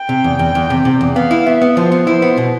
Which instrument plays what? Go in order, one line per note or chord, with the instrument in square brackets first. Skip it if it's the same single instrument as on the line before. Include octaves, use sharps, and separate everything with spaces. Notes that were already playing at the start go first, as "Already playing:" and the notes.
Already playing: [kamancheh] G5
[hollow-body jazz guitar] C3
E2
E2
E2
C3
C3
E2
[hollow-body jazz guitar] B3 [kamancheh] F5
[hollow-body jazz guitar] E4
[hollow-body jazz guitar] B3 [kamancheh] E5
[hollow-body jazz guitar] B3
[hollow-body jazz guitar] F3 [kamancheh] C5
[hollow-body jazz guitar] B3
[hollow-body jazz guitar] E4 [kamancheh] C5
[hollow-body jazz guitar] B3
B2